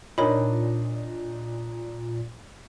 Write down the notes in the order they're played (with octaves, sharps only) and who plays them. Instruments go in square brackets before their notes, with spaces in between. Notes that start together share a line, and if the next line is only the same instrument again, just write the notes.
[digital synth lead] A#2 [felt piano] D4 D#4 D#5 [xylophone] A#4 C#5 B5